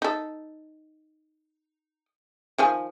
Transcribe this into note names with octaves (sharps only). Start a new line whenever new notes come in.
D#4 A4
D#3 F3 G#5